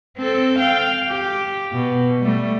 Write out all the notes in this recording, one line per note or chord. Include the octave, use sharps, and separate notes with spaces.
C4 A4
F5 G5
G4
B2
G3 A3